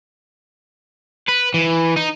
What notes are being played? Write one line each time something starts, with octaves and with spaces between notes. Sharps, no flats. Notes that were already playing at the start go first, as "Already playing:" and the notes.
B4
E3
D#4